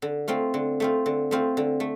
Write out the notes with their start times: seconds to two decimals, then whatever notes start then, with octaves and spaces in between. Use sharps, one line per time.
0.02 D3
0.28 A3 C4 F4
0.54 D3
0.80 A3 C4 F4
1.06 D3
1.31 A3 C4 F4
1.57 D3
1.80 A3